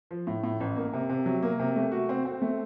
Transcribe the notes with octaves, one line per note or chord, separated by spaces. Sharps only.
F3
A2
A2
A1
A#3
C3
C3
F#3
A#3
C3
A3
F#4
C4
C4
A3